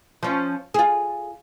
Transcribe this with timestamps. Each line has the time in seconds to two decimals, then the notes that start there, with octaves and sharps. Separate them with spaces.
0.23 F3 C#4
0.74 F4 G#4